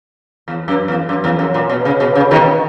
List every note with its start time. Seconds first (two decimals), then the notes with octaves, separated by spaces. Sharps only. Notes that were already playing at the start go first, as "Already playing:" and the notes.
0.48 E2
0.68 F#2
0.88 E2
1.09 F#2
1.24 E2
1.39 F#2
1.54 A#2
1.69 B2
1.85 C#3
2.00 B2
2.15 C#3
2.31 B2 D#3